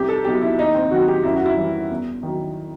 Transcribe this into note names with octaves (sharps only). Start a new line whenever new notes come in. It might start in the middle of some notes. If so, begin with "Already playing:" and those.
Already playing: C2 G4
A4
B2 F#3 G4
E4
D#2 D#4
C4
D#3 F#3 F#4
G4
F#2 E4
F#4
E4
E3 G3
E2
D#3 F#3